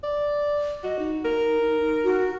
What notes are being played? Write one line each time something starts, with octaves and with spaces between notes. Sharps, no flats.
D5
F#4 D#5
D#4
A#4
F#4